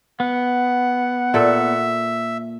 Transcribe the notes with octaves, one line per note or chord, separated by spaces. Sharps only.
B3 F#5
A#2 A4 E5